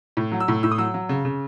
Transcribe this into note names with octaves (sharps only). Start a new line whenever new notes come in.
A2
F#3
E6
A2
A2 E6
D#6
F#3 E6
F#3
C#3
C#3